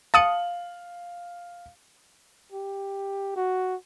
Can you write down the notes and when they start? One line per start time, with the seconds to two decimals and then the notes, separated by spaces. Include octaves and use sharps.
0.14 F5 A5 D#6 C#7 F#7
2.52 G4
3.36 F#4